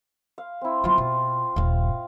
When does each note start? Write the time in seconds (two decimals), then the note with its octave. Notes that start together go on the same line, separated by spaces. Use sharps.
0.38 F5
0.61 C4 E4
0.84 F#3 B3 F4
0.98 B2
1.56 D#1 G2 F5 G5